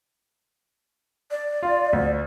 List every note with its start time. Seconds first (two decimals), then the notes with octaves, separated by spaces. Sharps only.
1.31 D5
1.63 F4
1.93 D2